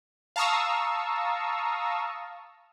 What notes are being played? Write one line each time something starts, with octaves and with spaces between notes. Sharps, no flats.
F5 A5 A#5 C#6 D#6 E6